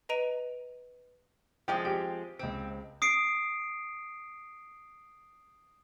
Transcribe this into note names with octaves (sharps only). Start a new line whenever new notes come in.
B4 D#5 A#5 D7 D#7 F7
F3 G#3 C4 G5
G4 D7
C#2 C4 D7
D#6 C7 D7